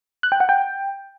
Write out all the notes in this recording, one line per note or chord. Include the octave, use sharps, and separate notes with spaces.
F#6
G5
F#5
G5